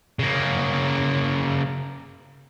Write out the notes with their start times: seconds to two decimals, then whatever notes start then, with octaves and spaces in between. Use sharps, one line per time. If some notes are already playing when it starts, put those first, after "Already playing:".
0.19 C#3 A#3